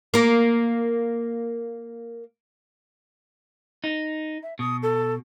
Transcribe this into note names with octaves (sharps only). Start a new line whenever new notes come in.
A#3 A#4
D#4
E5
B2 D#6
A4